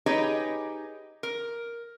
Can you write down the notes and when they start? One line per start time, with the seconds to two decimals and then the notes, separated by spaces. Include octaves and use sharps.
0.06 D#4 G4 G#4 B4 C#5 D#5
1.23 A#4